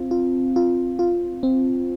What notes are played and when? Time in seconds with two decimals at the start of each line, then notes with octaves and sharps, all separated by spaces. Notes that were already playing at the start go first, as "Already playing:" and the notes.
Already playing: C4 F4
0.11 F4
0.56 F4
0.99 F4
1.43 C4